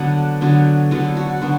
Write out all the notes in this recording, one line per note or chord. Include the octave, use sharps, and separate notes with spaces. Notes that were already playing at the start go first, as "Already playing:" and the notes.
Already playing: D3 F#3 B3 D4 F#5
D3 F#3 B3 D4
D3 F#3 B3 D4 A4
F#4
D3 F#3 B3 D4